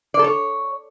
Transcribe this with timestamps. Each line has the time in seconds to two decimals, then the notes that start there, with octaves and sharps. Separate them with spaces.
0.14 D5
0.19 A4
0.24 C#5